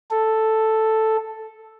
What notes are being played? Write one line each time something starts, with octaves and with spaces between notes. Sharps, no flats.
A4